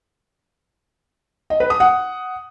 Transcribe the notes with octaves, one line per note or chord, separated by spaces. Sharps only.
D#5
B4
D#6
F#5